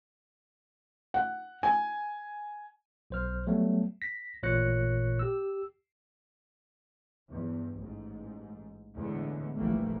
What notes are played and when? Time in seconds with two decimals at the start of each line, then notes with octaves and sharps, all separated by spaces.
1.14 F#5
1.63 G#5
3.10 B1 C5 F6
3.47 F#3 G3 A3 B3
4.02 A#6 B6
4.43 A1 A#2 C#5 F#6 A#6 C#7
5.19 G4 E6
7.29 E2 G2
7.80 A1 G#2
8.96 E2 A2 D3 G#3 B3
9.56 F1 A#1 E3 G3 A3 A#3